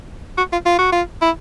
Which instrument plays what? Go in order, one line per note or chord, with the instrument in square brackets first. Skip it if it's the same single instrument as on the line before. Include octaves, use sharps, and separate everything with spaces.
[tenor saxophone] F#4
F4
F4
F#4
F4
E4